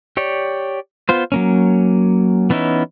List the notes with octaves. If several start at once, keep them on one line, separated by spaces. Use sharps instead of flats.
G4 C#5 D5
B3 F4 C5
F#3 A#3 C#4
E3 B3 C#4 D#4 E4